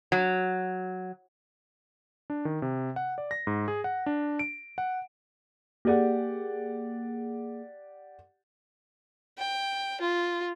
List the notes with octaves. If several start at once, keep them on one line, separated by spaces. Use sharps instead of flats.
F#3
D4
D#3
C3
F#5
D5
A#6
G#2
G#4
F#5
D4
D7
F#5
A#3 G4 G#4 D5 F#5
G5
F4